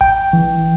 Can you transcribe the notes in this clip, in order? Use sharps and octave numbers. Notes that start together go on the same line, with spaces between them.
A1 G5
E3